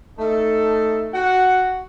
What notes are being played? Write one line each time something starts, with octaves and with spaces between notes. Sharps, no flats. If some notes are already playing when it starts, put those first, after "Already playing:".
A3 D#4 A4
F#4 F#5